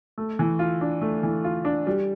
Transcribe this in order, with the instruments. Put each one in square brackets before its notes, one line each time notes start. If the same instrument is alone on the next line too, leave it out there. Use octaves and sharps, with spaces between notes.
[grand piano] A3
E3
F4
D4
A3
E3
F4
D4
G3